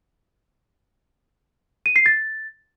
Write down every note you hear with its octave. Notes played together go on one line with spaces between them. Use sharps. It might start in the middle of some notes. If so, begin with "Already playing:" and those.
D#7
C7
A6